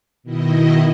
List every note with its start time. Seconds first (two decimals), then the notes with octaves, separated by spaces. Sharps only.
0.23 B2 D#3 E4 D#5